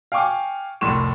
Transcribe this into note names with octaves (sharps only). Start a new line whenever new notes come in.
F5 G5 G#5 C#6 D6
F1 C2 A2 C6 C#6 E7